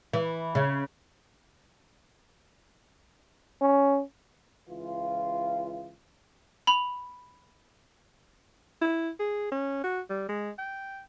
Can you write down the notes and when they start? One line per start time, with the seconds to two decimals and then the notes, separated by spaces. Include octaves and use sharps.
0.13 E3
0.55 C#3
3.62 C#4
4.68 C#2 E3 F4
6.67 B5 F7
8.82 E4
9.19 G#4
9.51 C#4
9.83 F#4
10.10 G3
10.28 G#3
10.58 G5